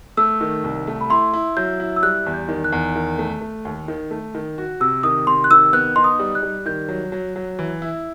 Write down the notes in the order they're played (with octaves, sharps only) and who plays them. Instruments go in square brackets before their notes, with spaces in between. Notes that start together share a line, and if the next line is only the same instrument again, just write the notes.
[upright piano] A3 [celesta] E6
[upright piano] D#3
C2
A3
[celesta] B5
[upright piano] E4 [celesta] C6
[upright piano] E4
[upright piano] F#3 [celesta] G6
[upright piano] E4
[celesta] E6
[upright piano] G3 [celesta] F#6
[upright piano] E2
[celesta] G6
[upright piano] D#3
[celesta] F#6
[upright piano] E2
D#3
A3
A3
D#2
D#3
A3
D#3
F#4
[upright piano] C3 [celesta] E6
[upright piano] D#3 [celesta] D#6
[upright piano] C3 [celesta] C6
[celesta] F#6
[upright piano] D#3 [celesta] E6
[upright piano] B3 [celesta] F#6
[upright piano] D#4 [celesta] C6
[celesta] D#6
[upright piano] G3
[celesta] F#6
[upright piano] G3
[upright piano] D#3 [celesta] G6
[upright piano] F#3
F#3
F#3
E3
E4